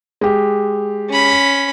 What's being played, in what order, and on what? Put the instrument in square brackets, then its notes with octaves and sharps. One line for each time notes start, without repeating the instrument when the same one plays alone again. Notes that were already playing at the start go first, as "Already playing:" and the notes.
[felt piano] G#3 G4
[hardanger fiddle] C#4 B5